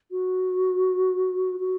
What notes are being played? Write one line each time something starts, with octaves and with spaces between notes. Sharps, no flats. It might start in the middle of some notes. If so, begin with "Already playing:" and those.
F#4
F#4